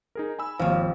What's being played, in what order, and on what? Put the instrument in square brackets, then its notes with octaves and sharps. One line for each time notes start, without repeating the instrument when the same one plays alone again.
[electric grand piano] D#4 G#4 A#4
G#5 B5 E6
[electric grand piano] G#1 [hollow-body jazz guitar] D#2 F3